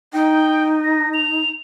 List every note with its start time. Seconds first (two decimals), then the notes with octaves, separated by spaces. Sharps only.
0.13 D#4 G5
0.84 A#6
1.14 F7